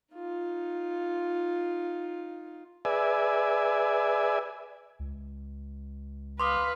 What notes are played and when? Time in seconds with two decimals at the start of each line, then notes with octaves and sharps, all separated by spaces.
0.14 D#4 F4
2.85 G#4 B4 D5 E5 G#5
4.99 C#2
6.40 B4 F5 C6 D6 D#6